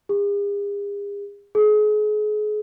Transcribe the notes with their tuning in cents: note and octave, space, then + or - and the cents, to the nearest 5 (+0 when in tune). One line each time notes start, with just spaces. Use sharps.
G#4 -45
G#4 +35